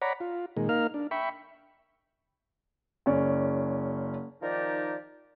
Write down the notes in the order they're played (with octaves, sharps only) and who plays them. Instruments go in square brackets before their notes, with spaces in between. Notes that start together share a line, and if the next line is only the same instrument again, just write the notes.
[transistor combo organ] C#5 D5 F#5 A#5 B5
F4
A#2 D#3 G#3
A#3 D#4 A#4 F5 F6
D4
E5 G5 B5 C#6
[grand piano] F#1 C#4 D5
[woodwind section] D#3 F3 D#4 G4 A#4 D5